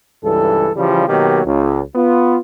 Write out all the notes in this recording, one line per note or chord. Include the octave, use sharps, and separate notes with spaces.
C#2 G2 E3 A4
C#3 E3 F3 G3
B2 D#3 F#3 A#3 G4
C#2
B3 F4